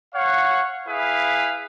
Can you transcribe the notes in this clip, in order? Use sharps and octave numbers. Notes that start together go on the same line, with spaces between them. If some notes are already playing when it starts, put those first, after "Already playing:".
C#5 F5 F#5
E4 G#4 B4 F5